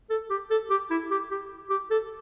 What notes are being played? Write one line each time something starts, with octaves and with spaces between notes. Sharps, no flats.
A4
G4
A4
G4
E4
G4
G4
G4
A4